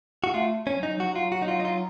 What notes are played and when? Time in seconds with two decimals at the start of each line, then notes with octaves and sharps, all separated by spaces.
0.24 F#4
0.34 A3 F4
0.67 C#4
0.77 F#3
0.83 D#4
0.99 F#3 F#4
1.15 F4
1.32 F#4
1.42 D#4
1.48 F4
1.60 D#4
1.65 F4